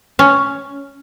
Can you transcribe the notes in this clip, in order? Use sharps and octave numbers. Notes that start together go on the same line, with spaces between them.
C#4